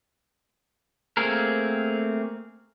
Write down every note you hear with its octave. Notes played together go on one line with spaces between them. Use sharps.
A3 A#3 C4 G#4 A#4